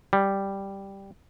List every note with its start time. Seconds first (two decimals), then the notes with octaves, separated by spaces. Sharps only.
0.13 G3